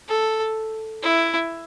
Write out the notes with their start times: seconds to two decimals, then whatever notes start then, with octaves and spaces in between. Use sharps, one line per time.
0.09 A4
1.02 E4